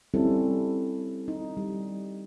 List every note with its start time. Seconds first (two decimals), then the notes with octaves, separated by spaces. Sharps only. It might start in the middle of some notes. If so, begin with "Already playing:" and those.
0.14 G3 C4 C#4 E4 A4
1.28 D#4
1.57 G3